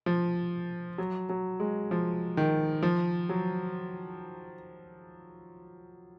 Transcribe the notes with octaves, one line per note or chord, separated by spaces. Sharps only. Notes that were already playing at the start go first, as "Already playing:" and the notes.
F3
F#3
F#3
G#3
F3
D#3
F3
F#3